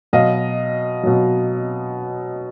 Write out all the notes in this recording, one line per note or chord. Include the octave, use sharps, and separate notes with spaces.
B2 F#3 D#5 F5
B2 F#3